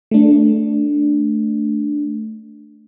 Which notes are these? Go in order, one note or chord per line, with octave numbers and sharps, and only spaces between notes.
A3 D4